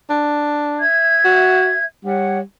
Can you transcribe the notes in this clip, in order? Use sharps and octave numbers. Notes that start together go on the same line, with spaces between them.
D4
E5 G#6
F#4
G3 C#5 F#5